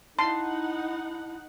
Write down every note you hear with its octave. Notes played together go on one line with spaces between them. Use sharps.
D#4 E4 F#5 A5 C6